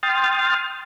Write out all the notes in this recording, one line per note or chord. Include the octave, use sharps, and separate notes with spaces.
G5 C6 D#6 F6 A6